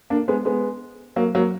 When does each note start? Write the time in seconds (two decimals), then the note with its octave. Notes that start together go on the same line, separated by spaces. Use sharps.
0.10 A#3 D4
0.28 G#3 B3
0.45 G#3 B3
1.16 F#3 A#3
1.35 F#3 A#3